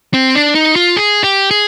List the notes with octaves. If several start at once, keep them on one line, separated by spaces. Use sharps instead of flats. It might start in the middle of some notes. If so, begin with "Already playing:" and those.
C4
D4
D#4
F4
G#4
G4
G#4